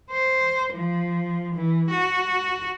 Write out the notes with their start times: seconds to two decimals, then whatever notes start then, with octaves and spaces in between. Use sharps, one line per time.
0.11 C5
0.73 F3
1.55 E3
1.91 F#4